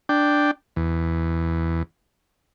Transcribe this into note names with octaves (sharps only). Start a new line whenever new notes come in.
D4 G5
E2